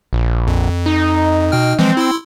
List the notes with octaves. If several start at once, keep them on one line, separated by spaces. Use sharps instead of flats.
A#1
F2
D#4
B2 G5 F6
E3 F3 G#3 C4
E4 C6 E6